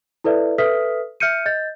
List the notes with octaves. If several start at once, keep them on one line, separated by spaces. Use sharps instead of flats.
E4 A4 B4 D5 E5
A4 B4 E5 D#6 F6 B6
E5 F6 G6 C#7 D#7
D#5 G6 A6